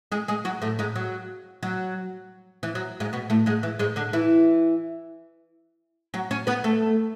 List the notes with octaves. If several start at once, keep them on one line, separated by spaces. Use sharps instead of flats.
G#3 G#4
G#3 G#4
F#3 F#4
A2 A3
G#2 G#3
F#3
F#3
E3
F#3
G#2 G#3
B2 B3
A2 A3
G#2 G#3
E3
G#2 G#3
D3 D4
E3 E4
F#3 F#4
C#4 C#5
B3 B4
A3 A4